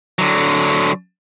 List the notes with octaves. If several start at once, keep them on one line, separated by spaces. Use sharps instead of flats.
D3 F#3